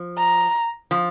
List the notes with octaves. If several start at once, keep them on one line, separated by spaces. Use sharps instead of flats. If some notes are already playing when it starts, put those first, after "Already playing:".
Already playing: F3
A#5
F3